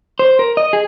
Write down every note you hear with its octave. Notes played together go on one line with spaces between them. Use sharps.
C5
A#4
D#5
G#4